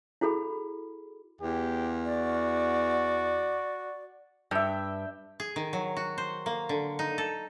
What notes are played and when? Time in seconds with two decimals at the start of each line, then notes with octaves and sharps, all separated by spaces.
0.21 E4 F#4 G#4 A4 B5
1.41 E2 G4
2.05 F#4 D5
4.51 G2 E5 G5
5.40 G#4
5.56 D#3
5.73 F#3
5.97 F#4
6.18 C5
6.46 A#3
6.69 D3
6.99 D#4
7.18 A4